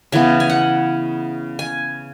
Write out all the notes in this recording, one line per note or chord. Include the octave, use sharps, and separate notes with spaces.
C#3 E3 B3 G#5
G#5
F#5
G#5